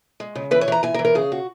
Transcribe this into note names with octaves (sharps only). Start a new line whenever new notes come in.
G#3
C#3
E3 B4
C#5
E3 A#5
E3 G#5
A#4
E3
A#4
C#3 G#4
F#4